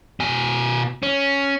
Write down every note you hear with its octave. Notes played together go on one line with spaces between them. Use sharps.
B2 G#5
C#4